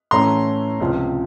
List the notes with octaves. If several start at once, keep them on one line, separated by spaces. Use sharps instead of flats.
A2 E3 A3 C#4 A#5 C6
C#2 C3 F3